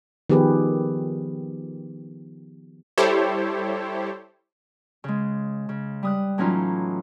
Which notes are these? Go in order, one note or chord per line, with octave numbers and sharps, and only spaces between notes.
D#3 F3 B3 G4 G#4 B4
G3 E4 G4 A4 C5 C#5
C#3 G#3
C#3
G3 D#6 F#6
A2 E3 F#3 C#4 D#4 F4